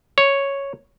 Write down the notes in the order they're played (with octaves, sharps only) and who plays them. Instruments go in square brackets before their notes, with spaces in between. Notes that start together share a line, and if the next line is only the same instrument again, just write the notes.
[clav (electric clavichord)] C#5